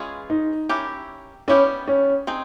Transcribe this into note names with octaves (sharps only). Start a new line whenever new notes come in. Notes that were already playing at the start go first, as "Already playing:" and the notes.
Already playing: E3 G#3 C#4 F4 G#4
D#4
C#4 E4 G4 A#4
G3 B3 C#4 E4 G4
C#4
C4 D#4 G#4